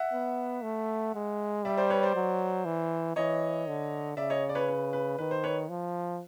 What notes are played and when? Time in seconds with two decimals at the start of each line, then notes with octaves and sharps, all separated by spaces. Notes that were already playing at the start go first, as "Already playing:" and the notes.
Already playing: E5 F#5
0.13 B3
0.63 A3
1.15 G#3
1.65 G3 D5 E5
1.77 C5 D5
1.90 B4 C#5
2.03 C5 D5
2.16 F#3
2.65 E3
3.16 E3 C#5 D#5
3.67 D3
4.17 C#3 D5 E5
4.30 C#5 D#5
4.49 D5
4.55 B4 C#5
4.68 B4
4.93 B4
5.18 D#3 B4
5.31 C5
5.44 B4 C#5
5.69 F3